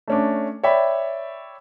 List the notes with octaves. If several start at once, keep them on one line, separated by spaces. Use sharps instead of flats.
A3 C#4 D4
C#5 D5 E5 G5 B5